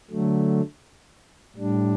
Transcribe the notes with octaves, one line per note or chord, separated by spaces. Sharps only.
D3 F#3 A3
A2 G3 D4